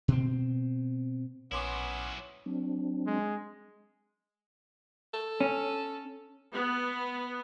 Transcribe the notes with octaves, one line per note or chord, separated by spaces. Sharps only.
B2 C4
A#1 F#3 B3 C#4 E4 C6 D6
F#3 C4 D4
G#3
A4
C#4
B3